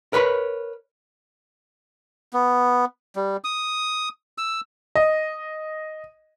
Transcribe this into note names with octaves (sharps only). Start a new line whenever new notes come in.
A#4 B4 C#5 B5
B3
G3
D#6
E6
D#5